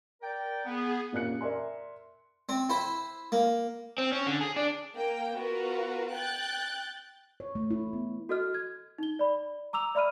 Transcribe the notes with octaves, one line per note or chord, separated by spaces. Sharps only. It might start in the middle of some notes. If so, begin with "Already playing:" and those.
A#4 D5 G5
B3 G#4
A#2 A#3 C#4 G4 F#6 C#7
A#4 D5 E5 G#5 C6
C4
E4 C5
A#3
C4
C#4
D3
G#4
D4
A#3 G5
B3 F4 F#4 A#4 B4
G5 F#6 G6 A6
C#5
A3
E4
B3
F#4 A4 D#5 F6
G#6
D#4 G7
D5 B5
A#5 D6 E6 F7
D5 E5 B5 F6 D#7